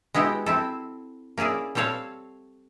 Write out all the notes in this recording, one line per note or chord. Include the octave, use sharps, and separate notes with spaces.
G#3 B3 E4 F#4 G4
C4 E4 A4
A#3 C#4 E4 G#4 D5
G3 C4 A4 C#5 F5